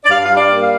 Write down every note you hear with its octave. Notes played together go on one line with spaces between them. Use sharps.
D5
G2 F5
G3 F5
D5
A#3
F5